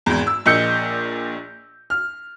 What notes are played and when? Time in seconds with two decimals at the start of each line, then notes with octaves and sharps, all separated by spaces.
0.06 G#1 E2
0.27 E6
0.46 A#1 A#2 D#5 E6 G6 C#7
1.90 F6